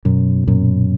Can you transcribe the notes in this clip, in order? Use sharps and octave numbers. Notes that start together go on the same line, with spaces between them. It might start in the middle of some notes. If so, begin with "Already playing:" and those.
F#2 B2
F#2 A#2